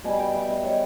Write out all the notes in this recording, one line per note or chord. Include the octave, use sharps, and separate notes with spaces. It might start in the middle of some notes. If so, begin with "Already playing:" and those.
B2 G3 G#5
G5
E5
D#5
C#5